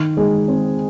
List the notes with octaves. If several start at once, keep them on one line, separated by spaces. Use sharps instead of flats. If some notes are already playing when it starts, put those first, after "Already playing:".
Already playing: D#3
G#3
C4